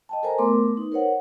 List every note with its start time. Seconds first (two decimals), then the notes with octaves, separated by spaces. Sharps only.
0.09 D#5 G5 A5
0.23 A4 A#4 C5 G#5 A#5
0.38 A3 B3 A#4 C6 D6
0.77 D#4 B4
0.92 A#4 C5 C#5 F#5